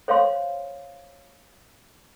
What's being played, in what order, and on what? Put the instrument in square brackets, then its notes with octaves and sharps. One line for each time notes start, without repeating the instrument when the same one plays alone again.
[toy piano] C5 C#5 F5 C6